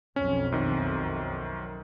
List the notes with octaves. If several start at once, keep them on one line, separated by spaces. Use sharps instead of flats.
B1 F2 C#4
F#2 D#3